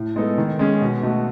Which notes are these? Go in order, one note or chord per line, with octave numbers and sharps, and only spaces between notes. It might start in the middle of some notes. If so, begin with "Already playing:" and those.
Already playing: A2
G#3 B3 D#4 A4
D#3
G#3 C#4 G#4
B2
A3 D#4 F#4